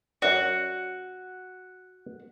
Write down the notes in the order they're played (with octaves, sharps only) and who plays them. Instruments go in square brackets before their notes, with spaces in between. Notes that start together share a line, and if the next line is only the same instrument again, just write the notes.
[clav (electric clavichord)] F#2 D5 [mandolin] F#4